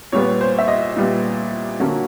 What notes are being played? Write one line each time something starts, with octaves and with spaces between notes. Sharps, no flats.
A#2 G3 B3 C#5
C5
E5
D#5
A#2 G3 B3
D3 F#3 A#3 C#4